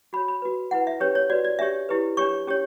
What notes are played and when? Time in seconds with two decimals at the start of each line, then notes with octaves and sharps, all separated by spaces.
0.13 F#4 C#5 B5
0.28 B5
0.42 F#4 B4
0.71 E4 B4 F#5
0.87 E5
1.00 C#4 G4 B4 C#5
1.15 C#5
1.30 F#4 B4 D5
1.44 D5
1.59 D4 G4 C#5 E5
1.89 E4 G4 B4
2.17 D4 G4 C#5 C#6
2.47 C#4 G4 C#5